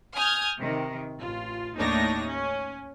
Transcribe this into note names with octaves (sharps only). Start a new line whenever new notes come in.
G#5 D#6 F6 G6 G#6
C3 D#3
A1 F4
D#2 A2 D4 D#4 C#5 A#6
C#4